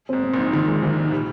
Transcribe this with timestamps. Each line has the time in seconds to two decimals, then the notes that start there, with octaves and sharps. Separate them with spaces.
0.09 G#2 C4
0.23 C4
0.33 A#1 A#2
0.38 D#4
0.53 A#1 A#2 D#3
0.68 G#3
0.82 C2 C3 D#3
0.98 D#4
1.11 A#2 G3